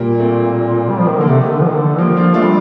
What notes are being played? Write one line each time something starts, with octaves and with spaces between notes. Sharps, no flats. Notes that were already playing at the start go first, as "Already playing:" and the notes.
Already playing: A#2 G3 A#3
A3 C4
G3
F3
D#3
D3 A#3
C3 A3
D#3
D3
F3
D#3
D3
F3 G3 A#3
D4 F4
A3 D4 F4
G3